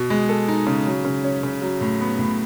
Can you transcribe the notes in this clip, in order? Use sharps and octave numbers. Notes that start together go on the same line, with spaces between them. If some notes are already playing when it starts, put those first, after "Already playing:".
Already playing: B2
G#3
A4
D#4
C#3
F#3
C#3
C#4
C#3
F#3
A2
B3
A2